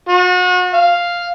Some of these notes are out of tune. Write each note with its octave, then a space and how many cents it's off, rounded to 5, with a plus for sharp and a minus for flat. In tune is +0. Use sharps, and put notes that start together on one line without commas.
F#4 -35
F5 +0